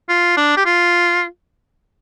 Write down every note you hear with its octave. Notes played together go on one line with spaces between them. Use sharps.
F4
D4
G4
F4